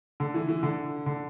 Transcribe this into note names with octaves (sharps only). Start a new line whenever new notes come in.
D3
E3
E3
D3
D3